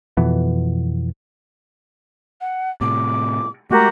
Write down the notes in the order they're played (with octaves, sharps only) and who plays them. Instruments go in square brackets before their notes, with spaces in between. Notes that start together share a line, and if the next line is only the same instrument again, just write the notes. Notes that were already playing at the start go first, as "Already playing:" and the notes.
[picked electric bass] F2 B2 E3 B3
[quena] F#5
[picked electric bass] A2 C3 [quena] D6
[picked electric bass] G#3 A3 [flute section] F#4 G4 A#4 [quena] D6